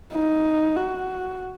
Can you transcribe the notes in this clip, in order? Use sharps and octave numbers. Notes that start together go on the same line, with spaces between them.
D#4
F#4